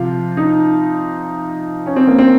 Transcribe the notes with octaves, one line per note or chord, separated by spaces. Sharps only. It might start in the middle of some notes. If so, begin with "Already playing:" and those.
Already playing: C3 F3 F4
D#4
C#4
C4
A#3
C4